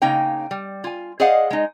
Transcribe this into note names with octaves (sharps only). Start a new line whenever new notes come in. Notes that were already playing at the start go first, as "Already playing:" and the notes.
C#3 A#3 D#4 C#5 G5
G3
F4 G#5
G#4 C5 D5 D#5 F5 F#5
G#3 D#4